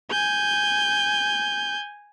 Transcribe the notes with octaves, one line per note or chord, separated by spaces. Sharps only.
G#5 G6